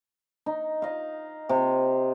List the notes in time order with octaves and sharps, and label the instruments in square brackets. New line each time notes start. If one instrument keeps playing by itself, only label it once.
[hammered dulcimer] D#4
D#5 F5
C3